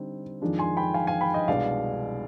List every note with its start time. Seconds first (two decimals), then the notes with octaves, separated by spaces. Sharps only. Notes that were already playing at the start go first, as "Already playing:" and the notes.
Already playing: D3 G3 C4 D#4
0.41 F2 D#3 G#3 D4 F4
0.59 G#5 C6
0.77 G5 B5
0.94 F5 G#5
1.07 F5 G#5
1.21 G5 B5
1.34 D#5 G5
1.48 C2 B2 G#3 D4 D5 F5